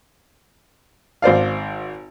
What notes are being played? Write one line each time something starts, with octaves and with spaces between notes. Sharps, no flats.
G#1 C5 D5 F5